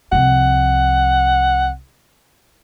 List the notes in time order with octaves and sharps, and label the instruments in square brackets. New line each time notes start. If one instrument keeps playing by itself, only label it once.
[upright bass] C2 F3 [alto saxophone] F#5